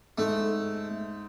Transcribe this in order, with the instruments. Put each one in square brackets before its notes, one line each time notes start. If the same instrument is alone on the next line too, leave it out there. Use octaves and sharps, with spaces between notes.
[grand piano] G#2 [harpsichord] A3